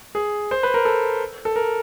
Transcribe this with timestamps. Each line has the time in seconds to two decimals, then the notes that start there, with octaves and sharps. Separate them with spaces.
0.15 G#4
0.51 C5
0.63 B4
0.74 A#4
0.85 A4
1.45 A4
1.56 A#4